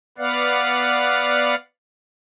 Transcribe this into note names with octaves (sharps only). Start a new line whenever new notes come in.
B3 B4 D5 F5 F#5